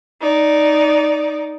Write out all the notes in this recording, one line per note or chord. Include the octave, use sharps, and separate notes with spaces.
D#4 D5